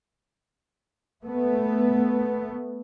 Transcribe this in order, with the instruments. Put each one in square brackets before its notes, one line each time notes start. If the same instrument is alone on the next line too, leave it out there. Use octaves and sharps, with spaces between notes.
[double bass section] A3 B3